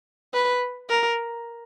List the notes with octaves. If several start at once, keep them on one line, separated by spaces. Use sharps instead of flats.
B4
A#4